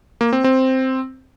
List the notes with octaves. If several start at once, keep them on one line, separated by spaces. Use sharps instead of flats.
A#3
C4
C4